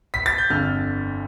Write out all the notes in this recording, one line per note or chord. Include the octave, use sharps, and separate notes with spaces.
B6
A6
G6
G1 F2 D3 F6